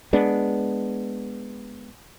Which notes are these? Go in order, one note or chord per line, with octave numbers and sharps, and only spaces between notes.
G#3 B3 D4